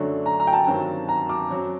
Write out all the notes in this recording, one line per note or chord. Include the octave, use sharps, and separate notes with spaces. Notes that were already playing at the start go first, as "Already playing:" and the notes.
Already playing: F#2 D3 F#3 A3 D4
A#5
A#5
G5
A5
G2 D#3 F#3 C4
A#5
D6
F#2 F#3 C4